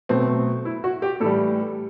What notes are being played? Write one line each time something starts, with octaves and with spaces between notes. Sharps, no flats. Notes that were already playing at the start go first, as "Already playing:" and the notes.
B2 F#3 A3 C4
E4
F#4
G4
A2 E3 G3 A4